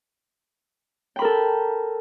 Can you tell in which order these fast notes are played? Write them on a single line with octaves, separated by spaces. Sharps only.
G5 B5 A#4 A4